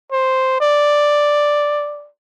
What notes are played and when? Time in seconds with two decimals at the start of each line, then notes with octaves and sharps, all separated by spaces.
0.12 C5
0.60 D5